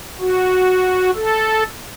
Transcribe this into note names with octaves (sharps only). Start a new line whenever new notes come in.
F#4
A4